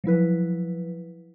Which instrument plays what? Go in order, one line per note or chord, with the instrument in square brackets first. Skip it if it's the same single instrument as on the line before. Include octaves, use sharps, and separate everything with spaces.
[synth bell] F3 F#3 E4 B4